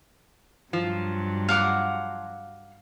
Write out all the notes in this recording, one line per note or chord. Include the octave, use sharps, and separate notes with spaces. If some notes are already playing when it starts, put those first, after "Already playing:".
G2 F3 F#3
F5 F#5 D6